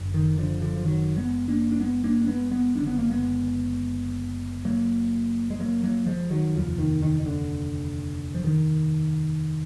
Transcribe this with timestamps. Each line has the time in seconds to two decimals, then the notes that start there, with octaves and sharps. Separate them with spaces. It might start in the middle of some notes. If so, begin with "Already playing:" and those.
Already playing: F#1 F#2 D3
0.14 D#3
0.38 D3 F3
0.61 D3 F3
0.77 F3
0.85 D#3 F#3
1.17 G#3 B3
1.48 A#3 D4
1.72 D4
1.80 G#3 B3
2.04 A#3 D4
2.22 D4
2.27 G#3 B3
2.51 G#3 B3
2.75 F#1 F#2 D3 D4
2.87 B3
2.99 A#3
3.11 G#3 B3
4.65 F#3 A#3
5.50 G#3
5.60 F#3 A#3
5.83 F#3 A#3
6.07 F3 G#3
6.31 D#3 F#3
6.54 F1 D#2 D3 F3
6.78 D#3
7.02 D#3
7.20 D#3
7.26 D3
8.35 F3
8.44 D#3